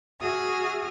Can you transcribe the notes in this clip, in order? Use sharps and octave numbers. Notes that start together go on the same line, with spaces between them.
F#4 G#4 E5 D#6 F6